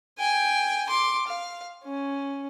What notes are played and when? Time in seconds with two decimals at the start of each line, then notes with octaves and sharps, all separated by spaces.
0.19 G5 G#5
0.89 C6 D6
1.27 F5
1.84 C#4